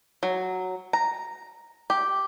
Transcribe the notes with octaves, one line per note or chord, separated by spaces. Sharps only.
F#3
A#5
G4